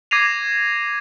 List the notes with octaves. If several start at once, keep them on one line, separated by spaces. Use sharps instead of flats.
D6 G#6 A#6 C7 D#7 F7